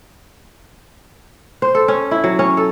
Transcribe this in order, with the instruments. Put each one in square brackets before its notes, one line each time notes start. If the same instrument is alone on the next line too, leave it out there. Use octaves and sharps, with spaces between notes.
[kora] C5
A4
C#4
E4
F#3
C#4
A4